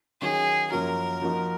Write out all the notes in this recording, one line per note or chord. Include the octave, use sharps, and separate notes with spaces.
D#3 F#3 C#4 F#4 G#4
F#2 F3 A#3 C#4 F#4 A#4
F3 A#3 D#4 F#4